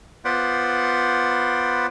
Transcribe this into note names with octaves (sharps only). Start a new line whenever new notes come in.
B3 F4 B4 C5 D5 F#5